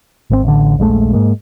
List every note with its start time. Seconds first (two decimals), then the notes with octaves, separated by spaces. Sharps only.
0.30 G#1 D#3 C4
0.43 A1 D3
0.78 D#1 A#1 G#3 A3
1.13 G#2 G#3 A#3